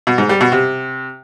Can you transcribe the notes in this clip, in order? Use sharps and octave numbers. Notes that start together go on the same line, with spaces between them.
B2
G#2
G3
B2
C3